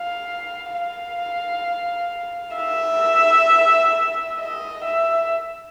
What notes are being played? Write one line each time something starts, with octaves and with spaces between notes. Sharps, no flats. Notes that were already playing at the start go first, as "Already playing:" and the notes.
Already playing: F5
F5
E5
D#5
E5